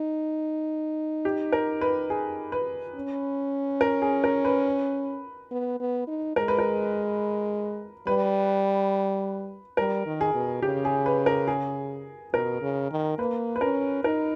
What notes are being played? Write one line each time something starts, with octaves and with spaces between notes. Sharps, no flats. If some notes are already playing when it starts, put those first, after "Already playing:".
Already playing: D#4
G4
A#4
B4
G#4
B4
C#4
A#4
G#4
A#4
B4
B3
B3
D#4
G#3 A#4
B4
A#4
G3 B4
G3 A#4
D#3
G#4
B2
C#3 G4
G#4
B4
A#4
G#4
B2 A#4
C#3
D#3
A#3 B4
B4
C#4 A#4
D#4 A#4